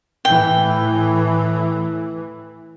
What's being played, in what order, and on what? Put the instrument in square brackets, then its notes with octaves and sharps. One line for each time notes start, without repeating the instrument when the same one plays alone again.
[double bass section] A2 E3 [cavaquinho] G5